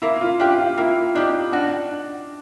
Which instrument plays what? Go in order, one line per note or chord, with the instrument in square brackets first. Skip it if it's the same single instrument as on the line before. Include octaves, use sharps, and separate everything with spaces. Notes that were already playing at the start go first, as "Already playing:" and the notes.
[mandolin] A#3 [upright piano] E4
[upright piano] F4
[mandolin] D4 G4 [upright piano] F4
[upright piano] F4
[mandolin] A#3 [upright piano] E4
[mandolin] D4 G4 [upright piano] D#4
[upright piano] D4 [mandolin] F#4